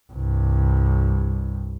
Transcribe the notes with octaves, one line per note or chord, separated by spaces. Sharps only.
C2 G2